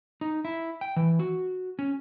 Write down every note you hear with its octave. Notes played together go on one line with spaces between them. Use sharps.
D#4
E4
G5
E3
F#4
C#4